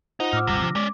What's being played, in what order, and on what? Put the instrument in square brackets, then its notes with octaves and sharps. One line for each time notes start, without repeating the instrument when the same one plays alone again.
[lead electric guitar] D#4 [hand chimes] F4 C5 F#5
[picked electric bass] A2 [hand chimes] D6 E6 F6
[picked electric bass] D#1 G#1 G3 [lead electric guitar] C3 [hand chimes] A#6
[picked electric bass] D3 F3
[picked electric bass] G#3 [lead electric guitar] C#4 D5 [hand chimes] D6